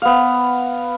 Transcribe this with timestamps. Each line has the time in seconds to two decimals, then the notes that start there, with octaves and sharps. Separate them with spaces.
0.02 B3 F5